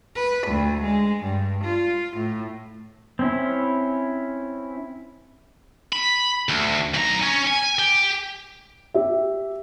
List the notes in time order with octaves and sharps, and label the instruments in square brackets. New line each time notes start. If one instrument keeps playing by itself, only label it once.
[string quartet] B4
D2
G#3
G2
F4
A2
[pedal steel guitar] C4 C#4 E4
[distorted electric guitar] B5
D2
B1 A#5
C#4 C#5
G#5
G4
[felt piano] G4 E5